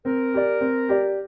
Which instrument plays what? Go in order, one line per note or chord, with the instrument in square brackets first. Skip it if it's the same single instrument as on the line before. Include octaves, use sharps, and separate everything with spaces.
[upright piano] C4 [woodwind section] A#4
[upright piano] G4 D5
C4
G4 D5